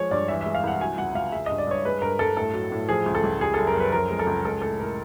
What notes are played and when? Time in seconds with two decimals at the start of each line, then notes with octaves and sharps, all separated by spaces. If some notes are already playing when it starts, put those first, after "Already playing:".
Already playing: F3 G#3 C#5
0.11 G2 D5
0.28 E3 E5
0.41 G#3 E5
0.55 F5
0.63 C2 F#5
0.80 F#3 G#5
0.98 C#2 F#5
1.15 C#2 F5
1.32 G#3 E5
1.46 G2 D#5
1.58 D5
1.67 G2 C#5
1.85 G#3 B4
2.02 G2 A#4
2.19 G2 A4
2.37 A2 A4
2.53 F#3
2.72 A2
2.89 F3 G#4
3.06 C#2
3.15 A4
3.23 C#2
3.40 G3 G#4
3.54 F#2 A4
3.67 A#4
3.76 F#2 B4
3.92 F3 A#4
4.11 G#3
4.19 A4
4.27 C#2
4.44 G#3 A4
4.62 A2 A4
4.79 A2 A#4